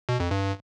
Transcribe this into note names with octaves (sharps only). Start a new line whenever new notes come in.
B2
F2
G2